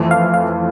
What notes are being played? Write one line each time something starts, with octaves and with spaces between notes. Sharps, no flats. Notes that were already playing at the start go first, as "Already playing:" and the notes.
Already playing: F2 E3 A3
F5
F5